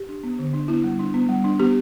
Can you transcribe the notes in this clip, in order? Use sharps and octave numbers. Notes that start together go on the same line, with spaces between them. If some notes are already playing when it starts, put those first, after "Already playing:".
Already playing: G4
D4
B3
D3
D4
B3 E4
G3
D4
B3
G3
D4
B3 G4